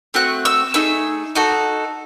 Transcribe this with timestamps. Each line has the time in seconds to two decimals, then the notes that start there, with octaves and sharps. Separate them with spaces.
0.14 A3 C4 F#4 F#6
0.45 E6
0.74 A3 D#4 G#4 E6
1.35 D#4 F#4 A4